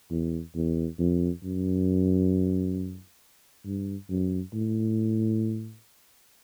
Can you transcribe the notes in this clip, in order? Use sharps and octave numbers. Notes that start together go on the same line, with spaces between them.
E2
E2
F2
F#2
G2
F#2
A2